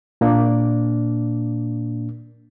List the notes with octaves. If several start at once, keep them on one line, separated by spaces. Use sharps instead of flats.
A#2 A#3 D4